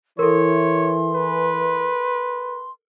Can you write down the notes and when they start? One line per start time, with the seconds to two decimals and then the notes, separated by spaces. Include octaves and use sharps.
0.19 E3 A4 A#4 C#5 C6
1.15 B4